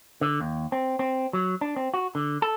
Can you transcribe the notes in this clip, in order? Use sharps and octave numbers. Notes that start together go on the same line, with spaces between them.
D3
D#2
C4
C4
F#3
D4
C4
F#4
D3
A4